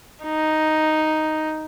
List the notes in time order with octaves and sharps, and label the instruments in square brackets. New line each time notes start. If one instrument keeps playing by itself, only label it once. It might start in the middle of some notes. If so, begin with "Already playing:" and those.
[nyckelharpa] D#4